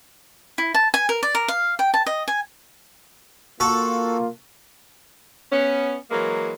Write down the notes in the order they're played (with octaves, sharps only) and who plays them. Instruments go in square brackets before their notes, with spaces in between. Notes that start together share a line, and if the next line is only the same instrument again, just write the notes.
[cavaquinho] E4
A5
G#5
A#4
D5
A#4
F5
G5
A5
D#5
G#5
[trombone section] A#3 F4 [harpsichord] F#4 A4
[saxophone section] B3 C#4
E3 F#3 G#3 A#3